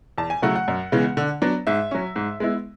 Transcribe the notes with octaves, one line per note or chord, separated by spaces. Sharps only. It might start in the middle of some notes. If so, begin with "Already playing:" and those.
E2 A5
G#5
C#3 F#3 A3 E4 F#5
F#5
F#2
C#3 E3 G#3 B3
D3
F#3 B3 D4
G#2 E5
F#3 C#4
G#2
G#3 B3 E4